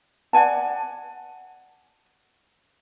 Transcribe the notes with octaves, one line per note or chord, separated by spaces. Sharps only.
D5 F#5 G#5 A5